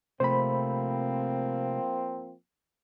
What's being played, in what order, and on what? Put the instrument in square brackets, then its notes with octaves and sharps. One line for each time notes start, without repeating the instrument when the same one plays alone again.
[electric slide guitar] C3 A3 [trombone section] F3 A#3 C4 [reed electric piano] C5 B5